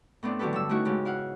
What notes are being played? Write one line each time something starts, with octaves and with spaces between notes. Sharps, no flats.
A2 B3 C4 D4
D3 E3 F#3 G4 A4 B4
G2 D3 E6
A3 C#4 D#4 E4 F#4
G#2 C#3 G#3 F4 G4
E4 F5 F#5